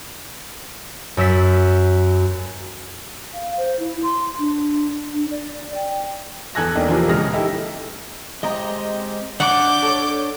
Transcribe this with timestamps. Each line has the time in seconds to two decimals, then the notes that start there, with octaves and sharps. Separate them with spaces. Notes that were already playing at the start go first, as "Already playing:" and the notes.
1.17 F#2 E6 B6
3.34 F5
3.57 C5
3.79 E4
4.03 C6
4.39 D4
5.13 D4
5.31 D5
5.74 G5
6.55 E2 A4 G#5 F#6 G#6 A#6
6.75 E1 B1 A#3 D5 G5
6.88 C3 E3 F3 A#3 F4 G#4
7.08 D#1 C#3 G#3 D#6 F6 A#6
7.33 D#4 E4 G4 A4
8.43 G#3 C4 G4 D#5 A#5
9.40 D4 D5 F#5 D6 G6
9.82 A4 C#5